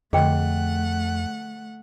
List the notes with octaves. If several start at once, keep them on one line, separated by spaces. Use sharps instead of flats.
F2 D3 F3 A3 G#4 D#5 F#5 G5